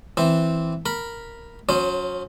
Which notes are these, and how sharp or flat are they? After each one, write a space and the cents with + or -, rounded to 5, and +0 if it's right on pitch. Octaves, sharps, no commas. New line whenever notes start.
E3 +0 C4 +0
A#4 -5 B5 -10
F#3 -35 C#4 +0 C5 +10